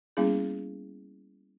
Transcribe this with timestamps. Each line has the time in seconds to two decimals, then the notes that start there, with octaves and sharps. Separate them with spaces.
0.17 G3 A#3 B3 C#4 E4 G#4